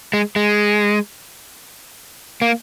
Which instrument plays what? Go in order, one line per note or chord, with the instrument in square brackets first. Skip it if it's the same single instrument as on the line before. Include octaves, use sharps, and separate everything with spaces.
[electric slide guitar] G#3
G#3
A#3